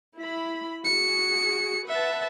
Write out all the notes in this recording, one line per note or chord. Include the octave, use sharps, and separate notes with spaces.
E4 B5
F#4 G#4 C#7
B4 E5 F#5 A5